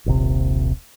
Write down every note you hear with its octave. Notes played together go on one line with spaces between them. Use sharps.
D#1 A#1 C3